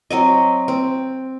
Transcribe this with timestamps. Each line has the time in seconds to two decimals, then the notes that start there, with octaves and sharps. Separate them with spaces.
0.10 F#3 C4 D#5
0.68 C4